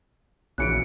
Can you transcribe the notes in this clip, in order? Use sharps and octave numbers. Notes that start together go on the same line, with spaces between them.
A#1 C#3 E3 F#3 F#6 C#7 D7